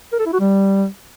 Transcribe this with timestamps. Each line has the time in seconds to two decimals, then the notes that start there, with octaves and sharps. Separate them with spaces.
0.12 A#4
0.19 A4
0.26 E4
0.33 F#4
0.40 G3